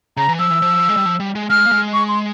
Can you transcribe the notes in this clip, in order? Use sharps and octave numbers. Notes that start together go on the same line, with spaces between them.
C#3 A#5
E3
F3 E6
E3
F3
G#3
G3
F3
G3
G#3
G#3 F6
A#3
G#3
C#6
C6